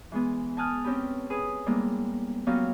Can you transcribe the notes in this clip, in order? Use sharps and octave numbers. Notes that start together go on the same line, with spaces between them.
E3 G#3 B3
G#5 A5 D#6 F6 F#6
C4 C#4 G4 B4
G#4 B4 D#6
G3 G#3 A#3 B3 E4
F#3 A#3 B3 C#4 G4 F5